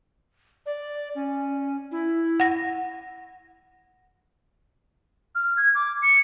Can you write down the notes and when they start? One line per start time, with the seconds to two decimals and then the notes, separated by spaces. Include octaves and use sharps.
0.66 D5
1.15 C#4
1.92 E4
2.40 F#5 A#6
5.35 F6
5.57 G#6
5.75 D6
6.02 C#7